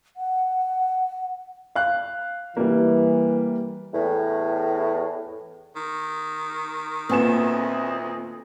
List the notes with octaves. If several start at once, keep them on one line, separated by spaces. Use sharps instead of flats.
F#5
F5 F#6
E3 G3 A#3
E2 A2
D#3
D2 A#2 B3 C4 D#5 E5 G#5 E7